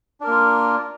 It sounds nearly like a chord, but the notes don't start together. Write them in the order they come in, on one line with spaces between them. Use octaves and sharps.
D4 A#4 A#3 F4